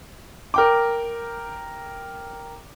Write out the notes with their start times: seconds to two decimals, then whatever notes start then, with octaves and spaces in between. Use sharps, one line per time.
0.54 A#4 G5 D6